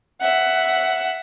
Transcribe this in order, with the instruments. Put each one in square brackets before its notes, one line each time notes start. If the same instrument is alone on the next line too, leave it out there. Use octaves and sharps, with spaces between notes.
[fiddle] E5 F#5